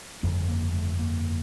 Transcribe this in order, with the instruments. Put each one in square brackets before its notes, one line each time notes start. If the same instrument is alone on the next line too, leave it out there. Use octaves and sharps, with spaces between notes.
[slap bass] G1 F2 C#3 A3
A#3
A3
A#3